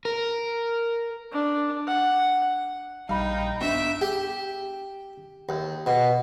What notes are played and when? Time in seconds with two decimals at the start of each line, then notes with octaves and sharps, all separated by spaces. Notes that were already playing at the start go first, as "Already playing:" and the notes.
0.05 A#4
1.32 D4
1.88 F#5
3.09 A#1 D#2 G3 D#4 F5 G5 B5
3.61 G1 B3 D4 E5 D7
4.01 G4
5.49 D#2
5.86 B2